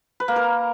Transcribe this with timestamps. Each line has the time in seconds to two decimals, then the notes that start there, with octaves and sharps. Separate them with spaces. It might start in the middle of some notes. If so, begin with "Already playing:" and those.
0.20 B4
0.28 A#3
0.36 A#4